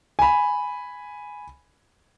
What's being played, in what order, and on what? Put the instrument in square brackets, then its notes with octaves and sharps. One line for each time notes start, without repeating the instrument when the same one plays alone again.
[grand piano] G#5 B5